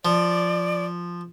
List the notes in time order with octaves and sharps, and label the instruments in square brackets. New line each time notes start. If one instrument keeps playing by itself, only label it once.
[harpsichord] F3 [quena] D5